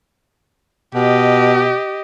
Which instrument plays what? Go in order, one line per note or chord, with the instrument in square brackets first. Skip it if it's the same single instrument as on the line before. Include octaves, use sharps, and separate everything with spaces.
[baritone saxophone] B2 [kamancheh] G4 D#5